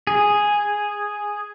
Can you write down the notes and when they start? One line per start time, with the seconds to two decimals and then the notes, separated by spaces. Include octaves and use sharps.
0.07 G#4